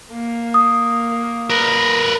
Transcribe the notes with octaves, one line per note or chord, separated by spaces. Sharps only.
A#3
D#6
A#4 B4